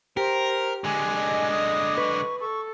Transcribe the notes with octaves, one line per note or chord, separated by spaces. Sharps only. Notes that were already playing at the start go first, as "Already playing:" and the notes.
G4 A#4 C5
D3 G#3 G#5
D#5
D#6
B4 C#6
A4 C#6